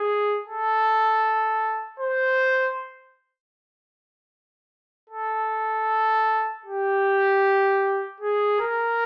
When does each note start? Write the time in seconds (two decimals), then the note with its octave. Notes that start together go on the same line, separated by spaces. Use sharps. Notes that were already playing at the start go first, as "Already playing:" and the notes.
Already playing: G#4
0.45 A4
2.00 C5
5.10 A4
6.66 G4
8.20 G#4
8.60 A#4